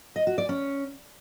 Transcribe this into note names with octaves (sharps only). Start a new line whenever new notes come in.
D#5
F#4
D5
C#4